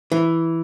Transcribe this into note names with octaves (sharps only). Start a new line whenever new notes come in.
E3